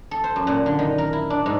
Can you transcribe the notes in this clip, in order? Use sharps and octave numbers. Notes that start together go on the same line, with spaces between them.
A4
C5
F#2
A#2
D3
D#3
A#4
E4
D4
G#2